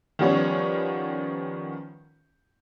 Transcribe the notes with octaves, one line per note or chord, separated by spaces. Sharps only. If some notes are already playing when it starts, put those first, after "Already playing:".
D#3 F3 G3 B3 C#4 C#5